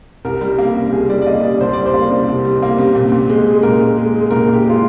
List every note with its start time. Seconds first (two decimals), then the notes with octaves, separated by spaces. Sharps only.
0.25 C2 A#4
0.41 G3
0.58 A#3
0.76 C3
0.93 C2 G#4
1.09 G3 D5
1.22 D5
1.26 A#3 D#5
1.43 C3 D5
1.61 C2 C5
1.73 G3 D5
1.86 C5
1.94 A#3
2.11 C3
2.28 C2
2.45 G3
2.62 A#3
2.78 C3
2.95 A#2
3.12 A#2
3.29 G#3
3.47 G#3
3.63 A#2 A#4
3.81 A#2
3.97 G#3
4.14 G#3
4.31 A#2 A#4
4.48 A#2
4.54 G4
4.64 G#3
4.69 F4